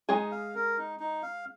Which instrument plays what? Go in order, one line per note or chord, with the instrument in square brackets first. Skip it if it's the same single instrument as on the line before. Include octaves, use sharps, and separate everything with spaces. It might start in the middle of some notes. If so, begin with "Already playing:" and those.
[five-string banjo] G#3 G#4 [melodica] D#4
[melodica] F5
A#4
D#4
D#4
F5